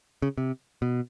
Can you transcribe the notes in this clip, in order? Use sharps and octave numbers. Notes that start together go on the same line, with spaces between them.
C#3
C3
B2